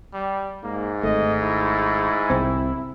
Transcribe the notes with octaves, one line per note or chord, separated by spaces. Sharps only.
G3
G#2 A#3
G#1 A3 D#5
E4
C2 C4